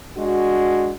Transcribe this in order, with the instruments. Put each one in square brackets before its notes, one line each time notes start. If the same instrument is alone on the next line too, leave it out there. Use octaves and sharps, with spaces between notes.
[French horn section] G#3 D4 F#4